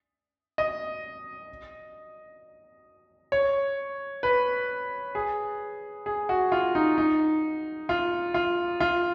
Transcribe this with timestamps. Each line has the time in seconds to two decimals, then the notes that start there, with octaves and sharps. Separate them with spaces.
0.58 D#5
3.32 C#5
4.23 B4
5.15 G#4
6.06 G#4
6.29 F#4
6.52 F4
6.75 D#4
6.98 D#4
7.89 F4
8.34 F4
8.80 F4